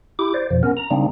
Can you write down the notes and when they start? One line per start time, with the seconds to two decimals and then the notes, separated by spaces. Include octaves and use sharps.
0.19 E4 G4 D6
0.34 C5 D5
0.51 F2 B2 F3
0.63 B3 C#4 A#4
0.77 A#5
0.91 C#3 G3 A#3 C4 D4 D#4